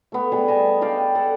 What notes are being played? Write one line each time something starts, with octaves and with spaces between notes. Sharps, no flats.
A3 B3
G3 B3 G#4
D#5 G#5 A5
B4 D5 F5 G5
A4 F#5